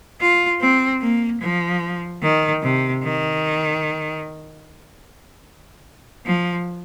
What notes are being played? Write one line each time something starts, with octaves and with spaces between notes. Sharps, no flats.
F4
C4
A#3
F3
D#3
C3
D#3
F3